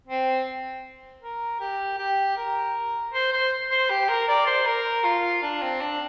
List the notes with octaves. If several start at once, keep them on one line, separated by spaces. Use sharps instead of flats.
C4
A#4
G4
G4
A#4
C5
C5
C5
G4
A#4
D5
C5
A#4
F4
D4
C4
D4